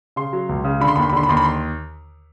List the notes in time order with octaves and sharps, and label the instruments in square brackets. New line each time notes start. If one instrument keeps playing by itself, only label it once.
[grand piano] C#3 C6
F#3
C#2
C#3
D3 B5
C6
D#2 B5
C6
B5
D3 C6
B5
D#2 C6
B5
C6